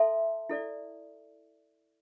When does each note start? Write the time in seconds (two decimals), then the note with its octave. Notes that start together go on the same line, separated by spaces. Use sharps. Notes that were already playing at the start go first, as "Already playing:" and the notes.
Already playing: A4 E5 A5 C6
0.50 E4 A4 D5